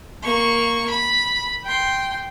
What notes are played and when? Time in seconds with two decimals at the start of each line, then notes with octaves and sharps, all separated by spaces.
0.23 A#3 C#6
0.90 B5
1.64 G5 C6